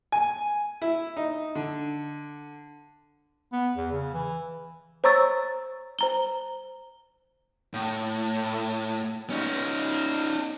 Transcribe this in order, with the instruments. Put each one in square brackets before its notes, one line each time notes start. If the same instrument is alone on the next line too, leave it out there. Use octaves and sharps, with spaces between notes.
[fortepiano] G#5
E4
D#4
D3
[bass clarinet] B3
E2
C#3
E3
[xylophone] C5 C#5 A#5 C#6 E6 A6
C5 A#5 G7
[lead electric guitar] A2
C#4 D#4